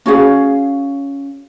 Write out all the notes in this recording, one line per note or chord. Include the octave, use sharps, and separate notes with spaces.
C#4 F#4 G#4 F5